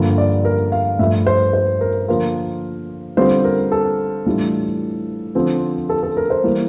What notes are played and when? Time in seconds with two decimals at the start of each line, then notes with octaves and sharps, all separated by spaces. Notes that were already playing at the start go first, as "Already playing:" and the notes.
Already playing: G2 D3 F3 A#3
0.18 D5
0.45 A#4
0.72 F5
0.99 G2 F3 A3 E5
1.27 C5
1.53 C5
1.81 A#4
2.08 D3 F3 A#3 F4 A#4
3.17 D3 G3 C4 F4 C5
3.44 A#4
3.72 A4
4.26 A2 E3 G3 D4 F4
5.35 D3 F3 C4
5.89 A4
6.03 A4
6.17 A#4
6.30 C5
6.44 E3 G3 A#3